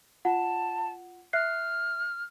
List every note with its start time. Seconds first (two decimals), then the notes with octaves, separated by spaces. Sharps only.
0.25 F4 F#5 A5
1.33 E5 F6 F#6 C7